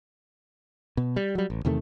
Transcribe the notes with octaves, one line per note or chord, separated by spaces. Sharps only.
B2
G3
F#3 G3
A1
E2 C3 D#3 A3